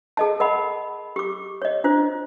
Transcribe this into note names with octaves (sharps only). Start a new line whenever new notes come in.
G#4 D#5 A5
A#4 D#5 F#5 B5
G4 D6
C#5 D#5
D4 F4 C5